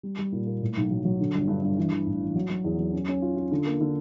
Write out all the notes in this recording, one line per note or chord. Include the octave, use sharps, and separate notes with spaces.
G3
G3
A#2
A#3
A2
B1
F#3
F#3
D3
G1
G2
G2
E3
E3
A1
E3
F#3
F#3
E2
F#3
C#4
C#4
F4
F4
D3
A#3
D3